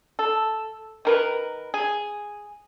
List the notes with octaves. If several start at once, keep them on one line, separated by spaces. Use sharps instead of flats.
A4
D#3 A#4 B4
G#4